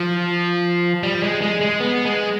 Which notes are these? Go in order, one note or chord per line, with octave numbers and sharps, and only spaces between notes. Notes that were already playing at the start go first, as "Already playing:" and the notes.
Already playing: F3
G3
G#3
G#3
G#3
B3
G#3